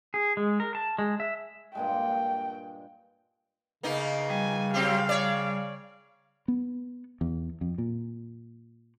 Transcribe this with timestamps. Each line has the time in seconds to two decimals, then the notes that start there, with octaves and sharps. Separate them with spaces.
0.14 G#4
0.37 G#3
0.60 A#4
0.75 A5
0.99 G#3
1.20 E5
1.75 G2 A#2 G#3 G5
3.83 C#3 A#3 B3 D#4
4.30 G3 G#5
4.74 F#3 C4 G4 F5
5.09 C#5 D5
6.48 B3
7.21 E2
7.61 F2
7.78 A#2